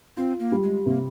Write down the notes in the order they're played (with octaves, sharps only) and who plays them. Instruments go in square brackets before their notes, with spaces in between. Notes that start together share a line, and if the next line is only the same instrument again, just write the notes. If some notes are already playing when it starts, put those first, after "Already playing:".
[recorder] C4 [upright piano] F4
[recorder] A#3
[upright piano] G3
[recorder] G#3
[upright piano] C3 [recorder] A#3